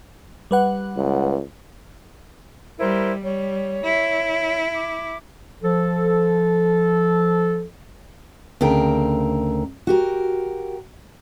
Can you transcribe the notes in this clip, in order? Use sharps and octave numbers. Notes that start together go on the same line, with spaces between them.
G3 B4 F#5
C#2
G3 E4 A#4 C5
G3 C#5
E4
D6
F3 A4
D2 C#3 C4 A#4 G5
F#4 G4 A#4